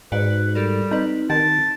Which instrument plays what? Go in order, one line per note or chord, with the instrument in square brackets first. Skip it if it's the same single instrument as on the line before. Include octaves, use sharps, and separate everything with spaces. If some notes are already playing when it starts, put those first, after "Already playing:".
[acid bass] G#2 [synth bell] F#4 D5 F#7 [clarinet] B4
[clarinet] G3 [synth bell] G4 A4 A#4
[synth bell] C4 B4 [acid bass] D#4
[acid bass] D#3 [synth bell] C4 G4 [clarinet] A5